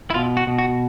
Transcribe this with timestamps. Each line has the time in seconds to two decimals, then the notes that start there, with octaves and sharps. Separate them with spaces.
0.10 E4
0.14 B2 F4
0.37 F#4
0.47 B2
0.58 F#4